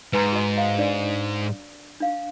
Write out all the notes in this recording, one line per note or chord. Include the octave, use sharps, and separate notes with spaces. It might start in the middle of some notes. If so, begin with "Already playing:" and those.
G#2 B4 G#5 A#5
F#4 D#5
F5 G5
D4 D5
D4 F5